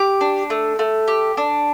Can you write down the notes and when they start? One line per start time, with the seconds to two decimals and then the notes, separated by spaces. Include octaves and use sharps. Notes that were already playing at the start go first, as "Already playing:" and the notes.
Already playing: G4 D6
0.21 D4
0.50 A3
0.79 A3
1.08 G4
1.37 D4